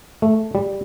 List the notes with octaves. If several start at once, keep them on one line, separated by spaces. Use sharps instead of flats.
A3
G3